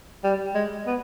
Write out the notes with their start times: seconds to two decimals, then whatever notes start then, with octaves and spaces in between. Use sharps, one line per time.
0.24 G3
0.55 G#3
0.86 B3